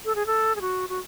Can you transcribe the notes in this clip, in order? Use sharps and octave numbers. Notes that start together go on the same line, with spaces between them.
A4
G#4
A4
G#4
F#4
F#4